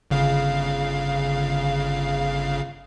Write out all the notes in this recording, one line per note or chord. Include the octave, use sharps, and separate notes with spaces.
G1 C#3 F5